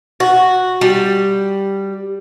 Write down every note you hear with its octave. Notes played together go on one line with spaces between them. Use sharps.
F#4
G3